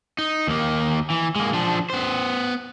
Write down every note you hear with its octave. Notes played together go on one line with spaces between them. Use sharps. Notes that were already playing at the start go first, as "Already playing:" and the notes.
D#4
D#2 A#3
E3
G#3 A#3
F3 D4
B3 C5